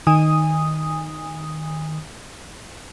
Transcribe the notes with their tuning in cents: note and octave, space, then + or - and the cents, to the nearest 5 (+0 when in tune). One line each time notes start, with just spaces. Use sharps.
D#3 +0 G#5 -25 D#6 +0